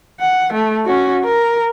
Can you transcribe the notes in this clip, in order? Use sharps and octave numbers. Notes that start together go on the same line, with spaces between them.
F#5
A3
C#4 F#4
A#4